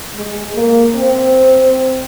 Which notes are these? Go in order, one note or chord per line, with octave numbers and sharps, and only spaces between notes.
G#3
A#3
C4